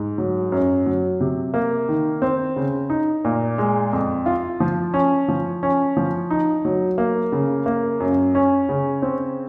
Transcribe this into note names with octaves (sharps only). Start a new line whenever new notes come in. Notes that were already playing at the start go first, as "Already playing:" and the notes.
Already playing: G#2
F#3
F#2
F#3
C3
A#3
D#3
C4
C#3
D#4
A#2
G#3
F2
F4
F3
C#4
F3
C#4
F3
D#4
F#3
A#3
C#3
A#3
F#2
C#4
C#3
C4